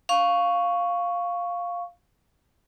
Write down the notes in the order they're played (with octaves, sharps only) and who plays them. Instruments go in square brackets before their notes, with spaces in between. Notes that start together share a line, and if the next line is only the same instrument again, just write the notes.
[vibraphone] F5 C#6